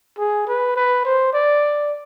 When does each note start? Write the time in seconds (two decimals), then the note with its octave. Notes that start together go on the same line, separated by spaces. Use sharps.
0.18 G#4
0.48 B4
0.76 B4
1.05 C5
1.33 D5